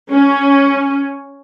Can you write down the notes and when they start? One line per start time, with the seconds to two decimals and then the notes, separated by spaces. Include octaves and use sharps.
0.11 C#4